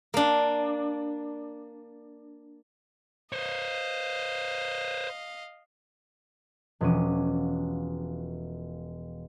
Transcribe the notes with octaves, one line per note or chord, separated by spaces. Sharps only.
A#3 D4
C5 C#5 D#5 F5
E1 F3 C#4 F#5 D6 D#7